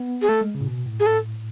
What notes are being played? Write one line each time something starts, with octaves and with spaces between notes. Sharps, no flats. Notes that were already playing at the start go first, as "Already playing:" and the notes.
Already playing: B3
G#4
A3 A4
G#3
C#3
A2
B2
A2
G#4
A4